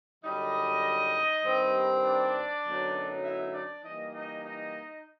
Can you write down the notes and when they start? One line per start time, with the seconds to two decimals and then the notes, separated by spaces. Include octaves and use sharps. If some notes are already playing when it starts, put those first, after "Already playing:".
0.24 F#2 D3 G3 D#4 D#5
1.43 G2 D#3 G3 C4
2.04 D4 D5
2.64 F#2 D3 F#3 B3 D#4
3.23 E4 E5
3.54 D4 D5
3.83 E3 G3 A#3 D#4 D#5
4.13 D#4 D#5
4.44 D#4 D#5